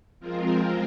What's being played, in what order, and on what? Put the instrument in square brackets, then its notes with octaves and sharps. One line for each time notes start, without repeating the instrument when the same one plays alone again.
[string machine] F3 G#3 C4 F4 A#4